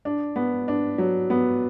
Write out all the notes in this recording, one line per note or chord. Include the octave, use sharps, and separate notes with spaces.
D4
B3
D4
F#3
B3